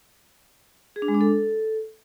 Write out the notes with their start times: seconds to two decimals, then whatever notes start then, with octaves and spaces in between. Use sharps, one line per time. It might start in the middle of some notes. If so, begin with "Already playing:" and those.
0.96 G#4
1.02 D4
1.08 G#3
1.14 D4
1.21 A4